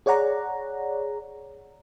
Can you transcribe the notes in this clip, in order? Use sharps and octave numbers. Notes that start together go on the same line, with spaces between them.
G#4 C#5 D5 F#5 A#5